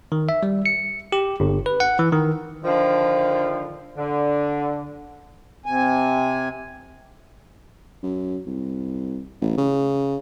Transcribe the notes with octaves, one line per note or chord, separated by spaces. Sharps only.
D#3
E5
G3
C#7
G4
G1
B4
F#5
E3
D#3
D3 D#3 F3
D3
C3 G#5
F#2
C2
A1
C#3